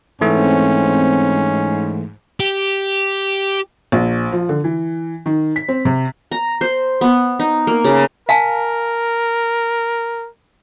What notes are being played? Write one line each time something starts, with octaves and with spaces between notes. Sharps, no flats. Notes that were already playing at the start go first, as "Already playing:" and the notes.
G#2 E3 A3 C4 C#4
G4
A#1
F3
D3
E3
D#3
B6
C4
C3
A#5
C5
B3
D#4
A#3
C#3
A#4 F5 G#5 A5